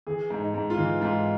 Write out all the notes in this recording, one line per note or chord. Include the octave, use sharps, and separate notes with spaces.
E3 G#4
G#2
D#4
G#2
F4
E3
G#2 F4